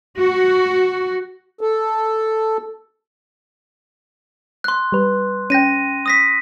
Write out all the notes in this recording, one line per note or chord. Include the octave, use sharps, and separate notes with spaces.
F#4
A4
C6 F#6
G3 B4
C#4 G5 A#6 D#7
D#6 A#6 B6